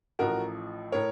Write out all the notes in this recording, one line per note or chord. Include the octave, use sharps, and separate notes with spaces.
A1 A2 F3 F#4 A#4
A2 A#4 C#5